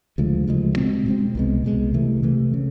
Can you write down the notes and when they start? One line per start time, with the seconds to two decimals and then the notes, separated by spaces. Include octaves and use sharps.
0.18 D2 C#3 F3 G#3
0.47 D2 C#3 F3 G#3
0.76 B2 G#3 C4
1.06 B2 G#3 C4
1.35 C2 B2 G#3
1.64 C2 B2 G#3
1.94 C3 E3 A3
2.23 C3 E3 A3
2.54 C#3